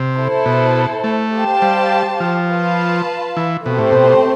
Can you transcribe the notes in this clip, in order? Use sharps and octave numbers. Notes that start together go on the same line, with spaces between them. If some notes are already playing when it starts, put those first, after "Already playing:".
Already playing: C3
E4 A4 C5
B2
A3
G4 C5 F5 A5
G3
F3
F4 B4 F5 A5
E3
B2 A3 C4 G4 C5
A2
B2